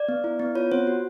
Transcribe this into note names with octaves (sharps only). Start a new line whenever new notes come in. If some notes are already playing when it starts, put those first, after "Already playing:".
Already playing: D5
B3
E4
B3
F4 C#5
C4 C5
F#4